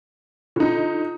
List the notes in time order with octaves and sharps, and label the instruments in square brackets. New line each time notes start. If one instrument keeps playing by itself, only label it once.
[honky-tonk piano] D3 D#4 [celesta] F4